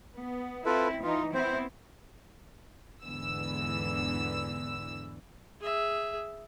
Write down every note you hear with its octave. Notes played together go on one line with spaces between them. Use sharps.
B3
C4 E4 F4 A4 B4
E3 D#4 F4
B3 C4 E4 C5
E2 G#2 D3 E3 B3 E6
G#4 E5